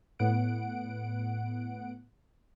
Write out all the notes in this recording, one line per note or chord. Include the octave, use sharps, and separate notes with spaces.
A2 B3 F#5 D7